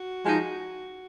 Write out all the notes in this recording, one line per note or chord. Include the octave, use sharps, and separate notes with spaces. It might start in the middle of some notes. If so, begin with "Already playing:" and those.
Already playing: F#4
F3 G#3 D#4